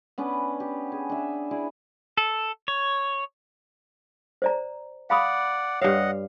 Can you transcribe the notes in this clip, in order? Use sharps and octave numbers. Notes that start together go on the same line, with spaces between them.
B3 C#4 D4 B4
G4
G#4
D4 E5
E4 G#4 D5
A4
C#5
C5 D5 A#5
D5 F5 F#5 B5 D#6
G2 C#5 D#5 F5 F#5